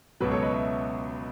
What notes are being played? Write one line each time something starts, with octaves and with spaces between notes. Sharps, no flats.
C#2 B2 F#3 B4
A4 C#5
B4 D#5
C#5 E5